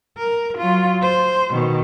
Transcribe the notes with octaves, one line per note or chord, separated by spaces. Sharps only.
A#4
F#3 F4
C5
B2 D#3